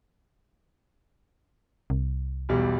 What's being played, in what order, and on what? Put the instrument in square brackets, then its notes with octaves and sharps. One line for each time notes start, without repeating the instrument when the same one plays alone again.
[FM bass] C2
[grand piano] B1 E2 G3